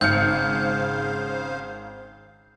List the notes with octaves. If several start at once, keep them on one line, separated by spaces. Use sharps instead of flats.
G#1 C#3 C5 F5 F6 G6 C#7